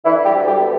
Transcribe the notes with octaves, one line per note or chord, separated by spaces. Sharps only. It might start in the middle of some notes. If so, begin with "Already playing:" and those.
D3 E3 E4
G3 G4
D2
G3 G4
B3